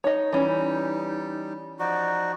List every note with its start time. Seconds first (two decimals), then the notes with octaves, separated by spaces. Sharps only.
0.04 D#4 C#5 D#5
0.33 E3 G3 C#4
1.79 F3 D#4 F#4 D5